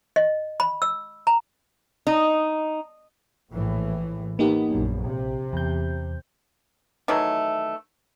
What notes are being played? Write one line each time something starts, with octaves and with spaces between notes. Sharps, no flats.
D#5
B5
E6
A#5
D#4
A#1 A2 E3
A#3 B3 D#4 G4
A#1 F#2
A#1 C3
E2 G6
D#3 E3 F#3 A3